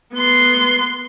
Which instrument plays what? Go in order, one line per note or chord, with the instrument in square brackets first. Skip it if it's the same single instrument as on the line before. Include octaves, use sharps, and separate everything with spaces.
[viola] B3 C6